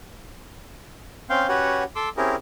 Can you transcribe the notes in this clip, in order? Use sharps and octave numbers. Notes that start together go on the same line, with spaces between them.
C4 C#4 F5 G5 C6
C#4 F#4 G4 B4 C#5 F#5
A4 C6 D6 E6
C4 C#4 E4 G4 G#4 A#4